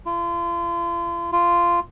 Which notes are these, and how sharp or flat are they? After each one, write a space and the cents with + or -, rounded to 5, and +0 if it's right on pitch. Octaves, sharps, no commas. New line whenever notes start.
F4 -35
F4 -10